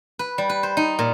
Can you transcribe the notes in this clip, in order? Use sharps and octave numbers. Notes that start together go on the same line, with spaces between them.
B4
G3
B4
C5
D#4
A#2